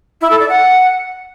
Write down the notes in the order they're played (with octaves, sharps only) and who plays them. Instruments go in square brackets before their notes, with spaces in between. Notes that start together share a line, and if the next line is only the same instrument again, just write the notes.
[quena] E4
A4
D5
F#5